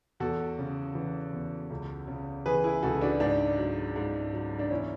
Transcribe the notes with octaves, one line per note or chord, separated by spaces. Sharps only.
E2 F#4 A4
C#3
E3
E2
C#2
C#3
E3 G#4 B4
E4 G#4
C#2 F#4 A4
D4 F#4
G#2 D4
F#3
G#2
F#3
D4
E2 C#4 E4